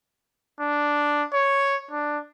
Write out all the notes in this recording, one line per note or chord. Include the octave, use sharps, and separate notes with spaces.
D4
C#5
D4